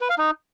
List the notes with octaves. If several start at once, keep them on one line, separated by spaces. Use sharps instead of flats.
B4
F5
D#4